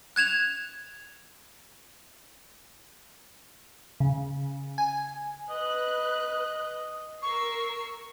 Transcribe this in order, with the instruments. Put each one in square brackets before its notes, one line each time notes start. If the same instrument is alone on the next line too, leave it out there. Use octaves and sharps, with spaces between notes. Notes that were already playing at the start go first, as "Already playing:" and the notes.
[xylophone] F#6 G#6 E7 F7
[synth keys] C#3
G#5
[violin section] B4 F#6 [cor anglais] D#5
[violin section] A#4 E6 C7 [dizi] C#6